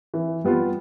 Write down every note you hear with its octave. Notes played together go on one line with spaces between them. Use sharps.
E3
G3 B3 F4